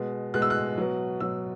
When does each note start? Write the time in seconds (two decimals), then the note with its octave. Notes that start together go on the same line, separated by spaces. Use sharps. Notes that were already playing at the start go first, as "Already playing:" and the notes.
Already playing: B2 G#3
0.34 B2 G#3 F#6
0.42 E6
0.50 F#6
0.78 B2 F#3
1.20 B2 F#3 E6